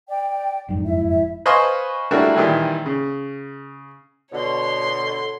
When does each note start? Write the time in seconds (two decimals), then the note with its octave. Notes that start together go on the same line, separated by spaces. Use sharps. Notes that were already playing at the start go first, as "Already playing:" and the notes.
0.09 D5 G5
0.69 F#1 F2 G#2 D#4
0.85 E4 E5
1.08 E5
1.46 B4 C5 D#5 F5 G#5 C#6
2.11 G3 A3 A#3 D4 E4 F#4
2.35 A#2 D#3 E3 G3
2.86 C#3
4.33 B2 D3 C#5 C6